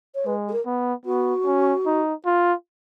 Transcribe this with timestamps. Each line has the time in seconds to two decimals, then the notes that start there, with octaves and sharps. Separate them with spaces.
0.15 C#5
0.26 G#3 B4
0.48 G#4
0.53 A#4
0.66 B3
1.05 B3 F#4
1.46 C#4
1.86 D#4
2.25 F4